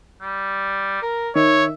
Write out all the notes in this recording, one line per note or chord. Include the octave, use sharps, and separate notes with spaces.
G3
A#4
D#3 C#5 E5